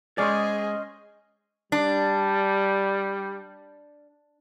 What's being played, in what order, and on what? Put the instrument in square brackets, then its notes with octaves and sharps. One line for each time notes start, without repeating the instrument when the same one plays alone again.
[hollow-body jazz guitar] G#3 D5 [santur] C#4 C5 [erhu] G#4 [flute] D#5
[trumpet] G3 [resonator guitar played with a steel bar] D4